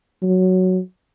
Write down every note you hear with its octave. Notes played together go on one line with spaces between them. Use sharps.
F#3